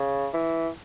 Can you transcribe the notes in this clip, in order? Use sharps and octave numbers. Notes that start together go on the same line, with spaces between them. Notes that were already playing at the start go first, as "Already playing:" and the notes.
Already playing: C#3
E3